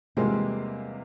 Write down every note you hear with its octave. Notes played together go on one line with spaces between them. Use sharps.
E2 C3 G3 G#3 A#3 C4 F4